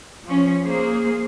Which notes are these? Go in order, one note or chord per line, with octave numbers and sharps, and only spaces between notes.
F3 C#4
A#3 G#4 C5